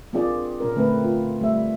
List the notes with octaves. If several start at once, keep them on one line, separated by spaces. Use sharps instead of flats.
A#3 C4 D4 F4 G#4 D5
A#2 C#4 A#4
D3 A3 C4 B4
F4
G3 A3 E5